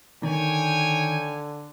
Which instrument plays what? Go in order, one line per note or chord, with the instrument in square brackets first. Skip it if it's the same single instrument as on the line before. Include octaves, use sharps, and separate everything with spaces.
[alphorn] D3 [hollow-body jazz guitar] D#3 [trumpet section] C#5 G5 G#5